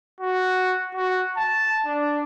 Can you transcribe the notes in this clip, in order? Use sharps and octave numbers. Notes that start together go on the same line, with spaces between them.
F#4
F#4
A5
D4